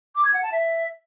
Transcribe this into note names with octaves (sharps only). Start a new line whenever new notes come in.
D6
G#6
F#5
A5
E5